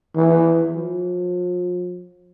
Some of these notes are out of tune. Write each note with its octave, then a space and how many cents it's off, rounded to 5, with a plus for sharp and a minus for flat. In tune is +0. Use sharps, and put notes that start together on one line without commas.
E3 +10
F3 +40